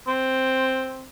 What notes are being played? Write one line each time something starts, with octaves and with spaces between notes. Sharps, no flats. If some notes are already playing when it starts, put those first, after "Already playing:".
C4